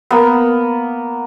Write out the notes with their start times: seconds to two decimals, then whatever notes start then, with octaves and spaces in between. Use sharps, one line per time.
0.11 A#3 B3